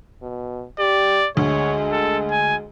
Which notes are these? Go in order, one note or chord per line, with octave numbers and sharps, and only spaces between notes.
B2
G4 D5
D2 G#3 C#5
A4
G#5